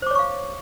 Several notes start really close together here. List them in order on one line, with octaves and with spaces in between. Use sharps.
C5 D6 C#5 C#6 F5